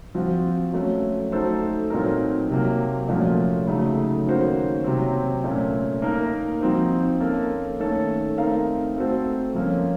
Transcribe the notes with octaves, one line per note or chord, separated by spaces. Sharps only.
F3 C4 F#4 C5
F#3 A3 C#4 F#4
A3 D#4 F#4 A4 C5
A#2 F#3 C4 D#4 A#4
C3 F#3 A#3
A#2 F3 A3 C#4 F#4
C#3 F#3 A3 D#4
D#3 A#3 C#4 F#4 C5
C3 F#3 C4
A#2 A3 C#4
A#3 D#4 A#4
F3 C4 D#4 F#4 C5
A#3 C#4 A4
D#3 A3 C#4 A4 C#5
A3 C4 D#4 A#4 F5
A3 C4 F#4 A4 C5
F3 A#3 C#4